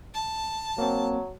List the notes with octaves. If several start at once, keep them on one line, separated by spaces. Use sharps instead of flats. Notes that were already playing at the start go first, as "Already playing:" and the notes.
A5
F#3 A#3 C4